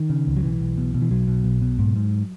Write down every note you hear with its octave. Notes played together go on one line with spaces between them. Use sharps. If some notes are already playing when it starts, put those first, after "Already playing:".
Already playing: D#3
C#3
C#2
F#3
B1 E3
B1
B2
B2
E3
B1 F#3
B2
B1
B2
G#2
G#2